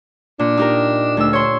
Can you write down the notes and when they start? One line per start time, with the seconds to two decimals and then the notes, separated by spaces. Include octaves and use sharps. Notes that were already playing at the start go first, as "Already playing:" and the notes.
0.39 A#2 D4
0.57 D#4 G4 A#4
1.17 D2 E6
1.33 C#5 C6